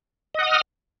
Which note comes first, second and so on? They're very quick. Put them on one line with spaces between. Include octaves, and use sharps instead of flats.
D#5 F#5 D#6 F6